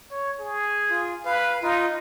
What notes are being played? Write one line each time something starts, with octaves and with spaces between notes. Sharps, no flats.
C#5
G#4
F4
B4 F5
D#4 F4